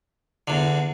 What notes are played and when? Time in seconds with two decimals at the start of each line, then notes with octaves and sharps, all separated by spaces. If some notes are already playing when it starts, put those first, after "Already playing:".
0.48 E2 D3